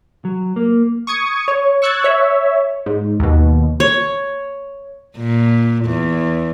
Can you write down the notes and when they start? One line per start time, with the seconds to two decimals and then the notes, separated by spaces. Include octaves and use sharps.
0.25 F#3
0.56 A#3
1.07 C#6 D#6 G#6 C#7
1.48 C#5
1.82 C#6 E6 F#6 G#6 A6
2.04 C#5 E5
2.86 G#2
3.20 D#2 B2
3.80 C#5
5.18 A#2
5.86 E2